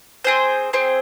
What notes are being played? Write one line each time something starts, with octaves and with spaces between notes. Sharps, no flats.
C4 G#4 C5
C4 G#4 C5